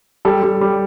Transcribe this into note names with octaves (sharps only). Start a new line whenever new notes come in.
G3 A4
G3
G3